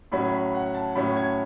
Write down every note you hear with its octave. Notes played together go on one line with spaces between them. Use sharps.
A2 F#3 C#4 B5
B5
F#5
A5
A2 F#3 C#4 B5
G#6